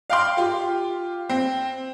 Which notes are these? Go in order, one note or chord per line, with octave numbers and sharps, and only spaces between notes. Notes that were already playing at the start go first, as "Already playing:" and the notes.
F5 G5 C6
F4 G4
C4